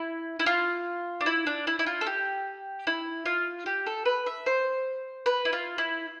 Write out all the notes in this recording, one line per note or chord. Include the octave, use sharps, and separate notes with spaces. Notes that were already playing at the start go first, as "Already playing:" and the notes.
Already playing: E4
E4
F4
D4
E4
D4
E4
E4
F4
A4
G4
E4
F4
G4
A4
B4
E5
C5
B4
E4
F4
E4